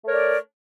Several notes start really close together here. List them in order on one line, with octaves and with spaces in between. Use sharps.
A3 A#4 C#5 D5